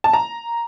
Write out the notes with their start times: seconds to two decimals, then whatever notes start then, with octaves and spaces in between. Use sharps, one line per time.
0.04 A5
0.13 A#5